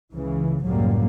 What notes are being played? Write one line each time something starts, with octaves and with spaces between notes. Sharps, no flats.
C#2 C#3 E3
C#2 F#2 A2 F#3 G3 A#3